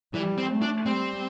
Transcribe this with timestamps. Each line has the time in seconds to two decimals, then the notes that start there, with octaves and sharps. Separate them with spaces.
0.14 E3 G3
0.38 C4
0.50 A3
0.62 D4
0.85 G3 C4